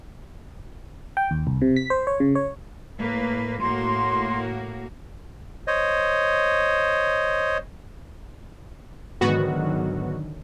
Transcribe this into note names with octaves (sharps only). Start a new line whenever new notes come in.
G5
D#2
C2
C3
B6
C5
C#5
C#3
C#5
A2 A#3 B4
A2 A#3 F#4 C6
C5 C#5 D#5
G#2 D3 D#3 F#3 B3 F#4